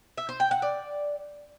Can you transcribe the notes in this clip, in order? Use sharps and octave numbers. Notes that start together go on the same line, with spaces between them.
E5
C5
G5
F#5
D5